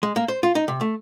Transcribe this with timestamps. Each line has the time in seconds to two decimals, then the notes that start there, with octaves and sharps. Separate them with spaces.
0.03 G#3
0.16 A#3
0.28 C5
0.43 F4
0.55 D#4
0.68 C3
0.81 A3